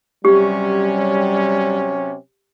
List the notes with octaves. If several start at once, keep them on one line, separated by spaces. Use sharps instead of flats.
C3 F#3 G3 C#4 G4